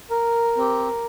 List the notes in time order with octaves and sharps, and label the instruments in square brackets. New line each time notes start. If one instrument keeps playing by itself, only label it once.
[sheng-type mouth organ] A#4
C4 G4